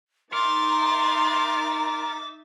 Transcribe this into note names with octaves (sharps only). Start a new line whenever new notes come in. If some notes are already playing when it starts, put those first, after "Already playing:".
D#4 A#4 E5 C6 D6 A6